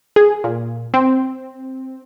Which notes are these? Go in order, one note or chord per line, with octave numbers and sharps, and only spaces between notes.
G#4
A#2
C4